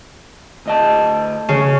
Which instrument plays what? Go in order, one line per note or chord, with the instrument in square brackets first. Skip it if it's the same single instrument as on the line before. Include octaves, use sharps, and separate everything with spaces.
[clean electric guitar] D2 D#5 A5
[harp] C#3